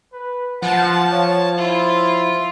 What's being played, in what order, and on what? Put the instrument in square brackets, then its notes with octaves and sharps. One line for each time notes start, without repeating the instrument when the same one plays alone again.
[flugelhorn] B4
[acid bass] F3 [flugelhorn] F#5 [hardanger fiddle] A5
[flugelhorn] C#5
[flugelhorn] E4 [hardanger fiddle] F4